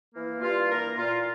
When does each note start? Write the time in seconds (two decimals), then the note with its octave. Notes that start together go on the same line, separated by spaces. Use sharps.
0.14 E3 A#3
0.42 G2 F4
0.69 E3 A#3 A#4
0.97 A#2 F4